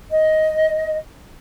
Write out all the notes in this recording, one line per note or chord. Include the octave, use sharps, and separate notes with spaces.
D#5